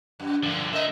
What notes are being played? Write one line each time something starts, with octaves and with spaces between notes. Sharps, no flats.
F#2
G2 D3 F3 A#3
A#2 D3 A#4 D#5 E5